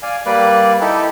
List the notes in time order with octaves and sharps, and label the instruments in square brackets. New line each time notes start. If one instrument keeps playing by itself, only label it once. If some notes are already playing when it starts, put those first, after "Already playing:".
[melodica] D5 F5 G#5
G3 A#3 B4 D5
D#4 E4 G4 A4